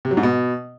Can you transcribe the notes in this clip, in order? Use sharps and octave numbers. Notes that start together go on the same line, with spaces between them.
C3
F#3
G#2
B2